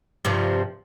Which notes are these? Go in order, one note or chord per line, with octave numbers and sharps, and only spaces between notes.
G2 C3 F3